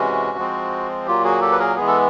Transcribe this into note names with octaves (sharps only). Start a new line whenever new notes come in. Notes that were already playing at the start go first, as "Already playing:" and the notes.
Already playing: C3 E3 G#3 C#4 F#4
F3 G#3 C4
A#2 F#3 A#3 F4 G4
F#4 G#4
G4 A4
B4
G#4 A#4
E3 G#3 B3 G#4
A4